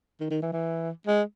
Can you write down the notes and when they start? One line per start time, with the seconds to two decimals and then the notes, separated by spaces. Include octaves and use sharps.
0.20 D#3
0.30 D#3
0.42 E3
0.52 E3
1.07 G#3